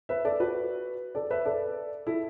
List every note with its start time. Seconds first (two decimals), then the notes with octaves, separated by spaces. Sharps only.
0.09 B4 E5
0.25 A4 D5
0.40 F#4 B4
1.15 A4 D5
1.31 B4 E5
1.45 A4 D5
2.06 E4 A4